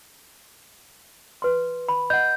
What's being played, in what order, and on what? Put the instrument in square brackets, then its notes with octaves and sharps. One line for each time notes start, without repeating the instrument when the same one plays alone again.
[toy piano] B4 C6
B5
[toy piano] D#5 F#5 [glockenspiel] G6